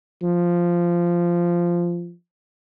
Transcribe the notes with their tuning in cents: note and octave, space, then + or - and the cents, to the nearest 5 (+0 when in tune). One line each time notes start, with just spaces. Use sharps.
F3 -10